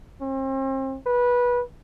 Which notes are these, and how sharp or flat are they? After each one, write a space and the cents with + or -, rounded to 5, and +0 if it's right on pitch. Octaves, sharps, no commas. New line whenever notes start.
C4 +40
B4 -20